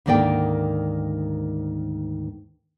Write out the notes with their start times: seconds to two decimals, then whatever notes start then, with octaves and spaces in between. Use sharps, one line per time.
0.06 D2 G#2 D#3 A#3 D5 G5